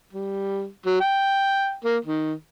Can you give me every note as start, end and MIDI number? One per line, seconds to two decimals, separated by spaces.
0.13 0.68 55
0.86 0.96 54
1.00 1.74 79
1.84 1.97 58
2.05 2.34 51